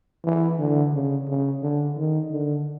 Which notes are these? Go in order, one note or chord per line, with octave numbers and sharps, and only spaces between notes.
E3
D3
C#3
C#3
D3
D#3
D3